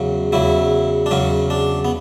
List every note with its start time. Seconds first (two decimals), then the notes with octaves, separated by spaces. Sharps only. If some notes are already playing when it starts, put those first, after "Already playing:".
Already playing: E2 C#3 F#3
0.32 E2 C#3 F#3 E4
1.06 D4
1.11 E2 C#3 F#3 C#4
1.50 D4
1.85 B3